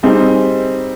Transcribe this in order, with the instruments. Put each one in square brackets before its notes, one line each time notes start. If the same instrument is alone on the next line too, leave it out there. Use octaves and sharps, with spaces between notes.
[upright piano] G3 C4 D#4 G#4